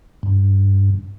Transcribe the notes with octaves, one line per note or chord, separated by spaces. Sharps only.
G2